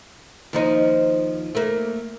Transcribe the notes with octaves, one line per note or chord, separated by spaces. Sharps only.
D#2 F3 D#4
A3 A#3